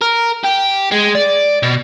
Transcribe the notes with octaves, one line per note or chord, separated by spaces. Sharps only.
A#4
G4
G#3
D5
B2